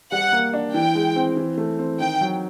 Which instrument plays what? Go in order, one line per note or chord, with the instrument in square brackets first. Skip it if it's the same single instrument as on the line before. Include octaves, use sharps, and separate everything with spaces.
[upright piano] G3 [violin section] F#5
[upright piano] A#3
D4
[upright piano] E3 [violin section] G5
[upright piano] G#3
C4
E3
A3
C4
[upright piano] D#3 [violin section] G5
[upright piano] F#3